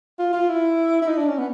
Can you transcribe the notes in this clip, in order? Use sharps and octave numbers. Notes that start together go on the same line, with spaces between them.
F4
F4
E4
E4
D#4
D4
C#4
B3